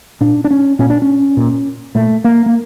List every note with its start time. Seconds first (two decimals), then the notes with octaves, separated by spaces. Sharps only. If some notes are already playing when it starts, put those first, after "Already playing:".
0.21 A#2 D4
0.44 D4
0.51 C#4
0.79 A#2 C#4
0.90 D4
1.02 C#4
1.37 A#2
1.95 A#2 A3
2.24 A#3
2.46 A#3